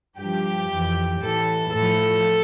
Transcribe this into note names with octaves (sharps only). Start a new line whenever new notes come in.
G2 F3 G4
F2 E3
A2 E3 A4
A2 F3 A4